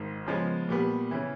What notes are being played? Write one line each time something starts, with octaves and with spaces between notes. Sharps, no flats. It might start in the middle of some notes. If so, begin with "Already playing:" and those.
Already playing: G#1 G#2
C#3 F3 G#3 B3
A#2 G3 B3
C#3 E3